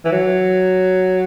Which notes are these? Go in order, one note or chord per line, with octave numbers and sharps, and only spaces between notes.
E3
F#3